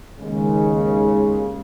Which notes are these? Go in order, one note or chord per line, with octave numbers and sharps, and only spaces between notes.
D#2 C#3 G#3